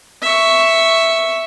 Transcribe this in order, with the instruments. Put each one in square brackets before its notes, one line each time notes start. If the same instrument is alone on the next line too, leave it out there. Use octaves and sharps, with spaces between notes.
[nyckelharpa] E5 C#6